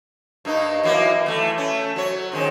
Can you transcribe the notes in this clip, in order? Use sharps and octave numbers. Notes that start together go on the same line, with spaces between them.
G2 A#3 D#4
E3 F#3 A#3
E3 A3
A3 C#4
F#3 C#5
G#2 D#3 C#4